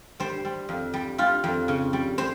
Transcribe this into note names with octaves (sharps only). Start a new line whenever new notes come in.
G3 C5
G3
F2
G3
G3 F4
F2
C#3
G3
C5